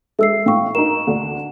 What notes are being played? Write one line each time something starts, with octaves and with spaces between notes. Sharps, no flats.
G#3 A4 E5 E6 C7
A2 F5 G5 C#6
D#4 A#4 E7
D2 D3